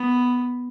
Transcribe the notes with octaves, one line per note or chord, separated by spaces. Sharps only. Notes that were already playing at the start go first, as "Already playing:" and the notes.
Already playing: B3